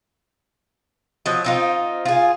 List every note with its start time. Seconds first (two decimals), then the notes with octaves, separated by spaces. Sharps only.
1.26 F3 F#3 D#5
1.44 C4 D#4 F4
2.05 F4 G#4